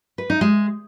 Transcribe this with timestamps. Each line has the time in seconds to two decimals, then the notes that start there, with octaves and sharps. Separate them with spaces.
0.18 B4
0.30 D#4
0.41 G#3